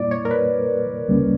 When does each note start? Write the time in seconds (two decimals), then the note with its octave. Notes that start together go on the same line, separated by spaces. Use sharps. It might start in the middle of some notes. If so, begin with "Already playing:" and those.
Already playing: A#2 G3 A#3 E4 D5
0.11 C#5
0.25 A#4
0.31 B4
1.08 D2 C#3 G3 A#3 C#4